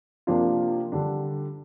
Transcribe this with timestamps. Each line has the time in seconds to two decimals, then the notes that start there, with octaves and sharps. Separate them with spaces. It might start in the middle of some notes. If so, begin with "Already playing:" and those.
0.27 C3 F3 A#3 D4 F4
0.92 D3 G3 D4